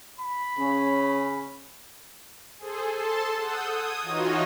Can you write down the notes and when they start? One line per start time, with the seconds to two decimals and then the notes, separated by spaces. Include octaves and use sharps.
0.19 B5
0.58 C#3 C#4
2.57 G#4 A4 C5
2.91 A4 A5 C6
3.37 F#5 D#6 E6 G6
3.68 D#6 G#6
4.02 E3 D#4 F4 F#4 C#5 D#5